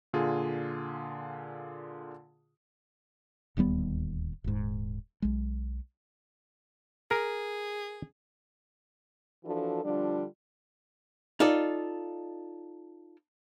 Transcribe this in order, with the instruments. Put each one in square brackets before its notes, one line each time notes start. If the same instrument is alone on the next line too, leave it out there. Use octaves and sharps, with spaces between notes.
[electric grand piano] A#2 D3 F4 G#4
[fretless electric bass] D1 D#2 G3 B3
D#1 G#2
B1 G#3
[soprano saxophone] G#4 [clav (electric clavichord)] A#4
[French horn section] E3 F3 D4 F#4 A4
D3 F3 G3 D4 F4
[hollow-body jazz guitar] D#4 F4 A4 D5